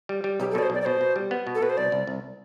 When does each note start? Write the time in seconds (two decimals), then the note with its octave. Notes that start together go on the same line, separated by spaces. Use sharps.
0.09 G3
0.24 G3
0.40 B1 G4
0.51 A4
0.55 B2 D5
0.63 C5
0.70 B1 D5
0.81 D5
0.85 B2 C5
1.01 B2
1.16 G3
1.31 B3
1.47 B2
1.55 A4
1.62 B2 B4
1.70 C5
1.77 C2 D5
1.92 C2
2.07 C2